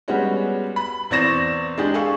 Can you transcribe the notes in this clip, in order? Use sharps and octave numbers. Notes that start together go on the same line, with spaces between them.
G3 G#3 B3 C#4 F#4
B5
E2 C4 D5 C#6 A#6 E7
G#3 D4 G4 G#4
G#4 A4 F5 C#6